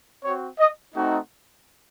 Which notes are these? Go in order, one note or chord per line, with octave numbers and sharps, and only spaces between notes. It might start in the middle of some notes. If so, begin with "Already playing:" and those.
C4 F#4 C#5
D#5
A3 C4 D#4 F#4